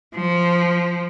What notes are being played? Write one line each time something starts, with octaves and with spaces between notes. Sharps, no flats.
F3